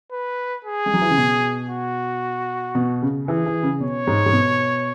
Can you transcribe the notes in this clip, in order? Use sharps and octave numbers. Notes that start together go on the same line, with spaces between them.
B4
G#4
G#3
F#3
E3
C#3
B2
F#4
B2
C#3
E3 G#4
E3
C#3
B2 C#5
G#2
G#2
B2